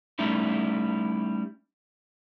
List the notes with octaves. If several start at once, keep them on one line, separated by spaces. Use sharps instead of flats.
G3 A3 C#4 D#4 E4